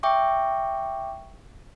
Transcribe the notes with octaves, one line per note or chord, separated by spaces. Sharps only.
E5 G5 C#6 D6